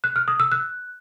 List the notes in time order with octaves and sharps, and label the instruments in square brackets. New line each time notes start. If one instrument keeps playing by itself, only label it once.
[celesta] F#6
F6
D#6
E6
F#6